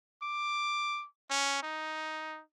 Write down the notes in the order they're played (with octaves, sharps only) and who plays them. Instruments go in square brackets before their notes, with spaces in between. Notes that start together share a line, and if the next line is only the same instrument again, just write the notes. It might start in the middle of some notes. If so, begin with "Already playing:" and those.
[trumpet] D6
C#4
D#4